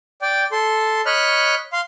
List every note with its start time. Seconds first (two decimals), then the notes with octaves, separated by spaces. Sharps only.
0.22 D5 G5
0.52 A4 C6
1.06 C#5 D#5 B5 F6 F#6
1.73 F5 C6